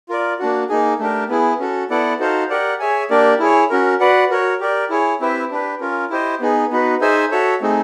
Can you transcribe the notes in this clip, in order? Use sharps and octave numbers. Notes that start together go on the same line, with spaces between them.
F4 A#4 D5
A#3 D4 F#4
A#3 D#4 G#4
A3 D4 G4 A#4
B3 E4 G#4
C#4 F#4 A4
B3 E4 A4 D5 F#5
D#4 F#4 A4 C5 F5
G4 A#4 D5 F#5
G#4 C#5 E5 G#5
A#3 D4 G4 A#4 D5
E4 G#4 C#5
C#4 F#4 A#4
F#4 B4 D5 F#5
F#4 A#4 C#5
G4 A#4 D5
E4 G#4 C#5
C4 E4 G4 B4 E5
D4 G4 B4
C#4 F4 A#4
E4 G4 C5 D#5
B3 D#4 G#4
B3 D#4 F#4 B4
D#4 G#4 C5 E5 G#5
F#4 A4 C#5 E5
A3 C4 D#4 G#4